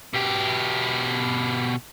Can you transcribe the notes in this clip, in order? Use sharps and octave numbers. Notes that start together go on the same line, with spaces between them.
B2 G4